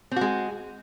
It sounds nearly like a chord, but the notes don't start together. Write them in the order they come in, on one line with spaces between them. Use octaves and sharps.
C4 F#4 G#3